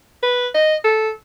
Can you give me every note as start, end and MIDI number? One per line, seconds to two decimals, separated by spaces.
0.23 0.47 71
0.55 0.75 75
0.84 1.10 69